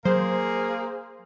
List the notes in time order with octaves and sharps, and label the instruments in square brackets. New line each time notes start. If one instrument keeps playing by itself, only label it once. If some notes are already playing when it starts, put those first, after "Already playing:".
[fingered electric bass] F#3 [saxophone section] A#3 G#4 [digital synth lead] C5